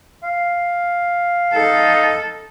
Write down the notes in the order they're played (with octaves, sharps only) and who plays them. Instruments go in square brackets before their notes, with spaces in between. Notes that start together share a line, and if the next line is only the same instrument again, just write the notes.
[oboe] F5
[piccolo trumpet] D#4 [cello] A4